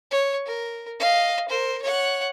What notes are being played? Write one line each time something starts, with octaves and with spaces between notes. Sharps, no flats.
C#5
A#4
D#5 F5
A#4 C5
C#5 F#5